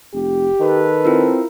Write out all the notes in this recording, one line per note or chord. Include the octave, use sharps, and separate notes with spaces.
F1 G4
D#3 A4 B4
C4 E4 F4 A#4